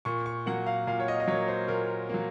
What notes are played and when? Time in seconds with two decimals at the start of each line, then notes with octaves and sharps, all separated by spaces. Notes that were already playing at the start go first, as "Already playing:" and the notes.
0.05 A#2 C#6
0.26 C#6
0.46 F#3 A#3 F#5
0.67 F5
0.87 A#2 F5
1.00 C#5
1.08 D#5
1.20 D#5
1.28 F#3 A#3 C#5
1.48 C5
1.68 A#2 A#4
2.09 F#3 A#3